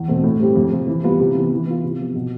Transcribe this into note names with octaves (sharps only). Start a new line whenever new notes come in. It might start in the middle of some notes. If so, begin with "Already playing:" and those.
Already playing: E2
B2 A3 C4
A2
G3 C4 G4
F2
C3 F3
E3
G3 B3 F4
C3
E3 B3
E3
B3 F4
C3
F3 B3
B2